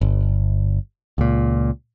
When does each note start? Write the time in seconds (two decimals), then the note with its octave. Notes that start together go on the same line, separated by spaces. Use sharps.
0.01 G1
1.18 C#2 A#2